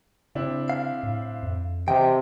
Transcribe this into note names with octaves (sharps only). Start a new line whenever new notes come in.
C#3 C4 D4 E4
F5
A2
F2
C3 E3 D#5 G5